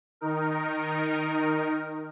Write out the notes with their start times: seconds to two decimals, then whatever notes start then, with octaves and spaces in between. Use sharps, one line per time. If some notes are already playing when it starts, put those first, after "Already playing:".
0.21 D#3 D#4 A#4